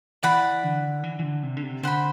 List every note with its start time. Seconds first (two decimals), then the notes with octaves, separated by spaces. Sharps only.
0.23 E3 D5 F#5 B5
0.63 D3
1.04 E3
1.19 E3
1.23 D3
1.43 C3
1.57 D3
1.63 C3
1.83 D3 C5 F#5 B5